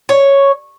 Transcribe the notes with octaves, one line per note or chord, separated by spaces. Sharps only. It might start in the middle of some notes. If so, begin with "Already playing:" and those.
C#5